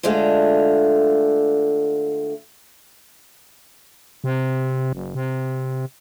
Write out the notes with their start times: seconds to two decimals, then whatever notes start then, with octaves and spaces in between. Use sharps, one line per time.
0.03 D3 G#3 A3 D4 F4
4.24 C3
4.93 F#1
5.15 C3